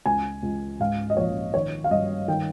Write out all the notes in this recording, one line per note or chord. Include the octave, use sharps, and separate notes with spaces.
C#2 G#5
C#2
G#2 F5
D#5
A#1 C#5
D#3 C#5
F5
G2 D#5
D#3 G5